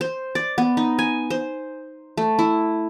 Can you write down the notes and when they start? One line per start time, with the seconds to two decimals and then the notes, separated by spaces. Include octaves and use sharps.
0.01 C5
0.35 D5
0.58 B3
0.77 D#4
0.99 G#5
1.30 C5
2.17 A3
2.39 E4